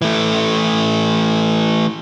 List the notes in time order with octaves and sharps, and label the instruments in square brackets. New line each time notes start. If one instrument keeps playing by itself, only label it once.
[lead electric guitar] E3 A3